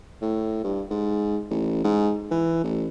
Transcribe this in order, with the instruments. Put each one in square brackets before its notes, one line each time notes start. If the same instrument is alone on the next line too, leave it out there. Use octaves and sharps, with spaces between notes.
[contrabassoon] A2
G2
G#2
A1
G#2
E3
A1